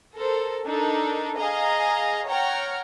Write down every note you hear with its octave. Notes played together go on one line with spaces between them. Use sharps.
A4 A#4 C5
D4 D#4 A4 A#4
G#4 D#5 F5 A#5
C#5 F#5 G5 A#5 F6